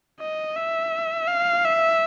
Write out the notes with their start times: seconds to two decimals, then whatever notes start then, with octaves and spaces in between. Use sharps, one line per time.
0.20 D#5
0.56 E5
1.28 F5
1.65 E5